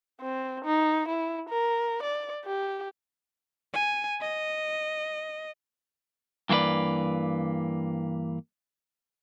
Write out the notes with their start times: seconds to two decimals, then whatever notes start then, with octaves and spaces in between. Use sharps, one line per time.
0.21 C4
0.65 D#4
1.08 E4
1.49 A#4
2.03 D5
2.45 G4
3.74 G#5
4.21 D#5
6.49 G2 E3 A#3 F4 B4 D5